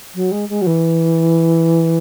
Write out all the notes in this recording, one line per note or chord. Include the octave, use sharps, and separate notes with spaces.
F#3
G#3
G#3
F#3
E3